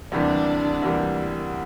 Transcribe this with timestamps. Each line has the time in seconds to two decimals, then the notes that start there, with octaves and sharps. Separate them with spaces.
0.12 D2 C3 E3 G3 A#3 D4
0.82 D2 C3 E3 G3 A#3